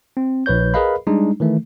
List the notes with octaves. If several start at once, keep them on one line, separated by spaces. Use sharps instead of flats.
C4
A#1 B4 C#5 G6
G#4 A#4 B4 D#5 F5 B5
G3 G#3 D4 D#4
D#3 E3 A3